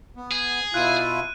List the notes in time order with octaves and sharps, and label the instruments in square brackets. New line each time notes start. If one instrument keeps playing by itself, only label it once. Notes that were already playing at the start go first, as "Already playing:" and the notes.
[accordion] B3
[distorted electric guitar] G#4
[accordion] B2 E4 F4 [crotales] F#6 D#7